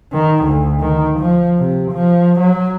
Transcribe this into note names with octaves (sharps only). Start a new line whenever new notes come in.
D#3
D2
D#3
F3
C3
F3
F#3